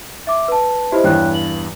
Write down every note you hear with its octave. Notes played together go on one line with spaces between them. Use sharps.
E5 D6
B4 A5
E4 G4 C5 D#5
E2 G2 C#5 G5 F#6
F#7